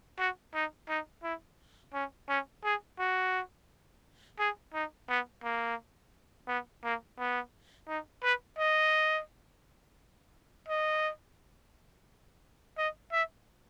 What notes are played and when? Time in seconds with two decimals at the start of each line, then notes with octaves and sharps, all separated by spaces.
0.18 F#4
0.54 D#4
0.89 D#4
1.23 E4
1.93 C#4
2.28 C#4
2.64 G#4
2.99 F#4
4.39 G#4
4.73 D#4
5.09 B3
5.43 A#3
6.47 B3
6.84 A#3
7.18 B3
7.88 D#4
8.23 B4
8.58 D#5
10.68 D#5
12.77 D#5
13.12 E5